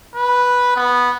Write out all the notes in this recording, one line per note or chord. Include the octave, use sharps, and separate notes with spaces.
B4
B3